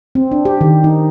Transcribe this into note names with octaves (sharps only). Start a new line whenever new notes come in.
C4
D4
G4
D#3
D#4